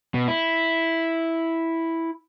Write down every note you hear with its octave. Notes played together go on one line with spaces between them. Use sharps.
B2
E4